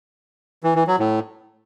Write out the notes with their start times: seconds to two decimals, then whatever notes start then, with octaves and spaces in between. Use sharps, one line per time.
0.63 E3
0.75 E3
0.87 F#3
0.99 A2